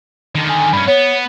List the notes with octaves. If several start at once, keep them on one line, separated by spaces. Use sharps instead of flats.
D3 D#3
G#5
G2 C#4 B5
B3 C#5